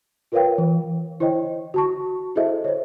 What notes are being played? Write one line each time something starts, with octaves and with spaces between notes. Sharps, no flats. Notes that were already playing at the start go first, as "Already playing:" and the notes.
F4 A#4 B4 C#5 F5 G5
E3
E4 C5 C#5 D#5 G5
F#4 A5 C#6
E4 G#4 A4 C5 D#5 E5
C5 C#5